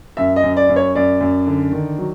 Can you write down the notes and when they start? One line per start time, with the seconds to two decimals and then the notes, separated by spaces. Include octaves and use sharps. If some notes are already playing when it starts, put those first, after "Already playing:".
0.17 F#2 E5
0.36 D#5
0.43 F#2
0.57 D5
0.69 F#2
0.76 C#5
0.95 F#2 D5
1.21 F#2
1.47 D3
1.72 D#3
1.98 F#3